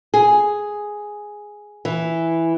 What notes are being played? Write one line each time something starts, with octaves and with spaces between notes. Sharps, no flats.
G#4
E3